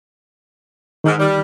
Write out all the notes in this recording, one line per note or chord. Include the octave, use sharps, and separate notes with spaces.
G#2 D#3 D#4 F6
G3